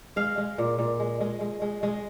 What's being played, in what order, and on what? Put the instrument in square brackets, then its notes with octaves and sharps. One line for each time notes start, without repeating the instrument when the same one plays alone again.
[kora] G#3 F5
G#3
A#2
A#2
G#3
G#3
G#3
G#3
G#3